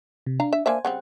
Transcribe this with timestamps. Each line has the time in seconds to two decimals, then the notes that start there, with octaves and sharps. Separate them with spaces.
0.27 C3
0.40 D4 F5 A#5
0.53 E5
0.66 A#3 D4 C5 E5 G#5
0.85 C#3 G3 C4 F#5